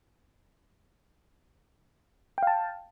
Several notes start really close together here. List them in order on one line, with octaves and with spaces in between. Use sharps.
G5 F5 A5